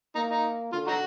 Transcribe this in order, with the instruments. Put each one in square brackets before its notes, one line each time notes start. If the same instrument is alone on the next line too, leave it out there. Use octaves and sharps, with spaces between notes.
[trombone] A#3 [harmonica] D#4
[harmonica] D#4
[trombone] D3 [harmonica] F4
[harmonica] D#4 F#4